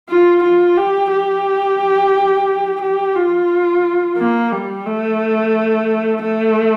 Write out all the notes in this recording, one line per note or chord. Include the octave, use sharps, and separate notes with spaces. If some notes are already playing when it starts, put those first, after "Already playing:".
F4
F4
G4
G4
G4
F4
A#3
G3
A3
A3